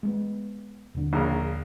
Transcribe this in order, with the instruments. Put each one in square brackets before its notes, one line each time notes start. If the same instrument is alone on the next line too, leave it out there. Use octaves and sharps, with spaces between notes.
[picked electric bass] G#3 A3 B3
D#1 D3
[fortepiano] A#1 C#3 A#4